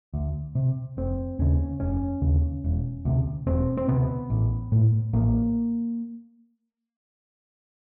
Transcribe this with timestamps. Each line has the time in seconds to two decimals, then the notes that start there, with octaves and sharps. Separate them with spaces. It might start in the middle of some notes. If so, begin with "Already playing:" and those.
0.14 D2
0.55 C3
0.97 F1 C4
1.39 D#2 C#3 C#4
1.80 F1 C#4
2.22 D#2 C#3
2.64 E1
3.05 D2 C3
3.47 E1 C4
3.77 C4
3.88 D2 C3 B3
4.30 A1
4.72 A2
5.13 A1 A#3